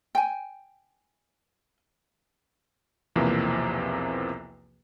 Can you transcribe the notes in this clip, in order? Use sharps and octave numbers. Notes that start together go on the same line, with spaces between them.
G5 G#5
B1 E2 C3 E3 F3 A#3